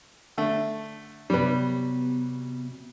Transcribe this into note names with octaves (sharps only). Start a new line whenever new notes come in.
D3 A3
C3 F#3 G3 B3 B4